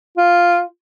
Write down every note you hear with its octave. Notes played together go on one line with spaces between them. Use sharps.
F4